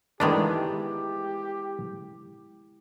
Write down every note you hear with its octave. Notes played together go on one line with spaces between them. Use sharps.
D#3 E3 G#3 A3 B3 D4 G4